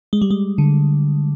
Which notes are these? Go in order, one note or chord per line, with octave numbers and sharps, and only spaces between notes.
G#3
G3
G#3
D3